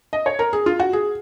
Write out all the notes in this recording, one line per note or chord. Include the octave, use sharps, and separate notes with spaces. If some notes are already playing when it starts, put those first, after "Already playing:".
D#5
C#5
A#4
G#4
F4
F#4
G#4